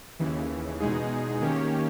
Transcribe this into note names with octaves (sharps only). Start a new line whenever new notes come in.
D#2 C#3 E3
E2 B2 G#3 D#4 G#4
D#3 A#3 C#4 G4 C#5